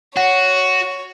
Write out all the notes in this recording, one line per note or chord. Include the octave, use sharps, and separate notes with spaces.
F#4 C#5 F#5